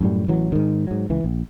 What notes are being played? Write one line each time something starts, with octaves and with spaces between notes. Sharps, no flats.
F#2 A2 G3
A1 E3 F#3
G#2 D#3
G#2 F#3
C#2 E3
A#1